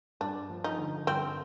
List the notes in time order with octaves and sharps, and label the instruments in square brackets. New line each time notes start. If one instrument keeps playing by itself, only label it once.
[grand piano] G2 [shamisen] D4
[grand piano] F3
[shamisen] D#4
[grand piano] D3
[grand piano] G2 [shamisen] C4